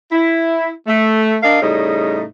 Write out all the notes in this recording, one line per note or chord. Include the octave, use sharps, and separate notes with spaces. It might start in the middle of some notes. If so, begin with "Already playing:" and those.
E4
A3
D4 A#4 D#5 F5
A2 C#3 G3 D#4